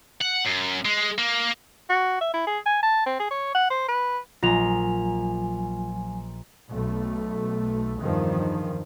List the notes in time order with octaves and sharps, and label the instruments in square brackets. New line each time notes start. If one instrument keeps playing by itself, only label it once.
[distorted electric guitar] F#5
F#2
G#3
A#3
[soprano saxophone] F#4
E5
E4
G#4
G#5
A5
C4
G#4
C#5
F#5
C5
B4
[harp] A#1 A#5 [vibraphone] F#3 G#5 [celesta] F4 F7
[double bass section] B1 A3
E2 G2 D#3 F3